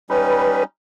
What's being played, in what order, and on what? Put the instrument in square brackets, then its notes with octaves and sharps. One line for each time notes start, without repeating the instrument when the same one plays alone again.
[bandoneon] G3 C#4 D#4 [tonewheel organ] B4